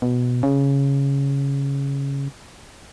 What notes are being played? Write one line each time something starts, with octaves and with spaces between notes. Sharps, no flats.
B2
C#3